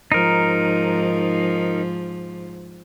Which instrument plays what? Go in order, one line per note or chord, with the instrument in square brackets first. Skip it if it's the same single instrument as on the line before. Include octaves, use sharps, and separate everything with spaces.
[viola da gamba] G#2 F3 [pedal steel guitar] D#4 A#4